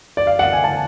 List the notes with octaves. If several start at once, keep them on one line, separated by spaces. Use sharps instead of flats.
D5
F5
F#5
G#5
A5